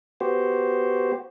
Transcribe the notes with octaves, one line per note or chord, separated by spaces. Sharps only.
B3 F#4 G4 C5